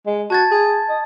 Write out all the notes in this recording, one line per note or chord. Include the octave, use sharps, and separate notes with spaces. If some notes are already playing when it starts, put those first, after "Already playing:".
G#3
F#4 A5 G#6 A6
G#4
D#5